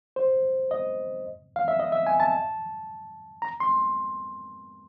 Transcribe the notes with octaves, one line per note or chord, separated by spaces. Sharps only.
C5
D#5
F5
E5
D#5
E5
G#5
A5
A#5
C6